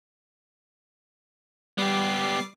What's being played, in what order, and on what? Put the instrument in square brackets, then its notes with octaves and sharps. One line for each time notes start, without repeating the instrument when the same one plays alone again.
[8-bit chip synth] G3 D6 C7 [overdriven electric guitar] B3 G4